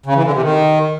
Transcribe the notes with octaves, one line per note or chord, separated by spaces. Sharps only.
C#3
E3
D3
C3
D#3